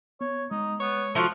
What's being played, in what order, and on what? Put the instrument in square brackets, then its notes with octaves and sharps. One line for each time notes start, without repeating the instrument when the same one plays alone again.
[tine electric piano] B3 [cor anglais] C#5
[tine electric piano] G#3 [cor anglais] D#4
[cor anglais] B3 [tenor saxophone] C#5
[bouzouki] F3 F4 F#4 [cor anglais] A4